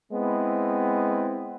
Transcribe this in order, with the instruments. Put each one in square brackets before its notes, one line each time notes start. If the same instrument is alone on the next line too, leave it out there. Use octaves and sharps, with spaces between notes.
[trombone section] G#3 B3 C4 E4